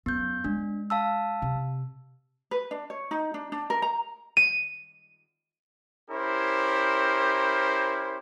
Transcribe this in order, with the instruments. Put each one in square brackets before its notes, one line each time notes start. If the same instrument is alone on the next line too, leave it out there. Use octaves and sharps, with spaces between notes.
[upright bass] F#2 [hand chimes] B3 G6
[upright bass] G#3 [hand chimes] D4
[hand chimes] F5 A5 E6
[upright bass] C3
[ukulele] B4
D4
C#5
D#4
D4
D4
A#4
A#5
[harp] D#7
[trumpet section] C#4 E4 G4 A#4 C5